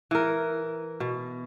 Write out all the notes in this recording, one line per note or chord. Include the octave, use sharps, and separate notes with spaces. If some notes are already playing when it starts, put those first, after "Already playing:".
E3 A#4
B2